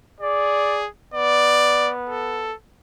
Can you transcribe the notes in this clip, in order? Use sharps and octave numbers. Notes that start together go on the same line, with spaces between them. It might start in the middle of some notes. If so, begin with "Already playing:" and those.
G#4 D5
B3 D5
A4